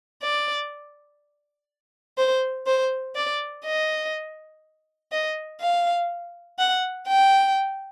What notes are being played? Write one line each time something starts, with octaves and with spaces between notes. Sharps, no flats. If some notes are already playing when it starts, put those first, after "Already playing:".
D5
C5
C5
D5
D#5
D#5
F5
F#5
G5